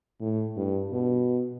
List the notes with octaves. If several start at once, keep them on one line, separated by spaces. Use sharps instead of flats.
A2
G2
B2